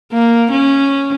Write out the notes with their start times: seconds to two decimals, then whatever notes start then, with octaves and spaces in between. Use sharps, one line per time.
0.13 A#3
0.52 C#4